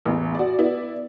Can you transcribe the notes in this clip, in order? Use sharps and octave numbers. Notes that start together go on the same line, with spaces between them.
A1 E2
F#4 D5
B3 E4 D5